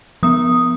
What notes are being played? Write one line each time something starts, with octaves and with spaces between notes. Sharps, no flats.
F3 B3 D#6